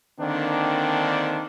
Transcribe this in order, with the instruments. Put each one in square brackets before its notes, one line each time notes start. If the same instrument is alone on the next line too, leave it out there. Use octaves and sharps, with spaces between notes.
[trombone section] D3 D#3 A#3 C4 D4